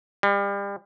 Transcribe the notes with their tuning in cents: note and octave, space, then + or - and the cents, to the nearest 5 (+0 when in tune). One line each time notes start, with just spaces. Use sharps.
G3 +35